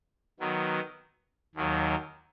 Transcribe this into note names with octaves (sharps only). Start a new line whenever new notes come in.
D#3 F#3 B3
D#2 D#3 F#3